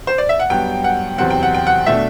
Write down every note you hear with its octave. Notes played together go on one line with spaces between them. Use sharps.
C5
D5
E5
F#5
G2 F#3 B3 G5
F#5
E2 C3 F#3 C4 F#5
G5
F#5
G5
F#5
B2 A3 D4 E5